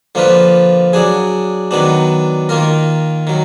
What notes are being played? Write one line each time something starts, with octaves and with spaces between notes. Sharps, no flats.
D3 F3 A#3 F4 B4
F#3 D4 G#4
D#3 F#3 B3 D4
D#3 A#3 F4 A#4
D#3 F#3